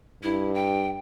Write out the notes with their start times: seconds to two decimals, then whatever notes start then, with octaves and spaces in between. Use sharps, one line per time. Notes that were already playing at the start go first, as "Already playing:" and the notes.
0.23 G2 E4
0.54 G5